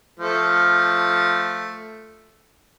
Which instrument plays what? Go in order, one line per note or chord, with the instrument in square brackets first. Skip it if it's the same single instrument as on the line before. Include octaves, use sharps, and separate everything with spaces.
[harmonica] F3 A3